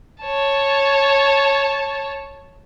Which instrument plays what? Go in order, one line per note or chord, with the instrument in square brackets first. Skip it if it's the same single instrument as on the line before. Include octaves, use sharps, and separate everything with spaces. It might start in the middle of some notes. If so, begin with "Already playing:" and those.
[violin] C#5 A5